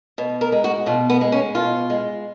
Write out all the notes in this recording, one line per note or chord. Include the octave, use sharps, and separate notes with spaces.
B2
A#4
G#3
F#4
B2 F4
B3
G#3
C#4
B2 F4
G#3